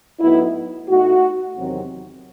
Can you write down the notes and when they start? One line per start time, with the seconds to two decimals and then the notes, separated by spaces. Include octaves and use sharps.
0.20 A2 F#3 B3 D#4 E4
0.89 B2 A3 D#4 F#4
1.57 E2 C3 D#3 F#3 C4